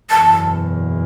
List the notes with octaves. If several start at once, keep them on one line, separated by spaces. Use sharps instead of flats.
F#1 E2 B2 A5